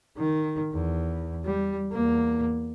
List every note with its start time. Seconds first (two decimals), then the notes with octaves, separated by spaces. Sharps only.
0.18 D#3
0.72 E2
1.44 G3
1.92 E2 A#3